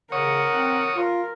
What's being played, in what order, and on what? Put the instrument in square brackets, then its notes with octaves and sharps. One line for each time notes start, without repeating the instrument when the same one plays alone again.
[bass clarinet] C#3 [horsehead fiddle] A#4 F#5 [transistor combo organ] C#5 D#6
[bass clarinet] C4
[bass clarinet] F4 [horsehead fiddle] A#4